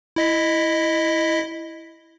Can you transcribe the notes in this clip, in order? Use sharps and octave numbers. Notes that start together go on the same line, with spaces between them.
E4 D#5 B6